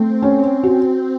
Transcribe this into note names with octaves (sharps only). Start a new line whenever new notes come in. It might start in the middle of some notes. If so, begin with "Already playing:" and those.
Already playing: A3 C4
C#4
F#4